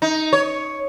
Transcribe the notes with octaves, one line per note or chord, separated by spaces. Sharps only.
D#4
C#5